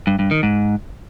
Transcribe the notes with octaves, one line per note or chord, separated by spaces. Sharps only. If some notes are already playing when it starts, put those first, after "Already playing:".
G2
G2
D#3
G#2